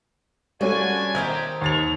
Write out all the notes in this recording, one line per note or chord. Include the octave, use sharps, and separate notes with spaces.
D3 G3 C#4 F#4 A4 G#5
D#3 E4 G4 C5 A#5 G#6
D#2 C#5 A6 F7